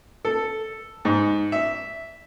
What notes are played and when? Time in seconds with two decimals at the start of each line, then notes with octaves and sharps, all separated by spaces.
0.25 A4
1.05 G#2
1.52 E5